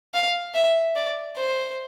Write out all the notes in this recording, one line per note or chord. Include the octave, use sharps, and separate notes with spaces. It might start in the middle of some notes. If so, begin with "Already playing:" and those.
F5
E5
D5
C5